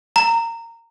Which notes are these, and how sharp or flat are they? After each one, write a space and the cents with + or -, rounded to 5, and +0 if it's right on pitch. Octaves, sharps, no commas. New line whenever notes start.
A#5 -20